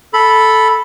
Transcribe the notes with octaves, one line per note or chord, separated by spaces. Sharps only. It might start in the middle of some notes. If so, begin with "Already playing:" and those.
A4 B5